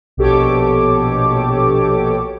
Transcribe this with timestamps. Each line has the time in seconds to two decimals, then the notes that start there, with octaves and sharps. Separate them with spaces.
0.17 A#1 B2 G4 A4 C#5 D6